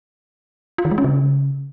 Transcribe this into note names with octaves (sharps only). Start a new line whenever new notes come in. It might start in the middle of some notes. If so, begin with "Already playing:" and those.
F4
D#3
G#3
C#4
C#3